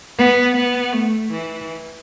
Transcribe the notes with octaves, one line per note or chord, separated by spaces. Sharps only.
B3
B3
A3
E3